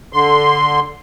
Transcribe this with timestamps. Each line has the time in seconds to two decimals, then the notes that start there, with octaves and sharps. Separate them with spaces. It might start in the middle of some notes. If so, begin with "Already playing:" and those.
0.13 D3 C6